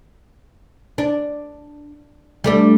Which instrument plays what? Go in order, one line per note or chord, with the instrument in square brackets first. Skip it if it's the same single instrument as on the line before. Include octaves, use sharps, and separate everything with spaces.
[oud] D4
G3 A3 D4